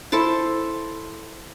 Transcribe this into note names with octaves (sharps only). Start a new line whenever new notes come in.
E4 A4 C5 A5